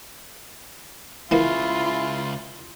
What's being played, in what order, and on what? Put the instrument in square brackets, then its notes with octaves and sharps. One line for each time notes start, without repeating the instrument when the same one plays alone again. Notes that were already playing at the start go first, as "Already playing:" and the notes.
[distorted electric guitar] C#2 C#3 [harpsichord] E3 A#3 [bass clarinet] E4 [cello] F4